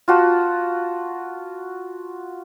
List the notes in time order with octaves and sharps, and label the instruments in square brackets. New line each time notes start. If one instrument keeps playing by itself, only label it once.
[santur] F4 F#4 A5